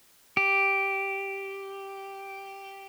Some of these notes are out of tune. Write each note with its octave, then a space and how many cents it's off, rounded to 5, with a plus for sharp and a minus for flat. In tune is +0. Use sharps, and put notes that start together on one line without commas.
G4 -5